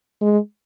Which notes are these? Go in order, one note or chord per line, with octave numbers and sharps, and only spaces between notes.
G#3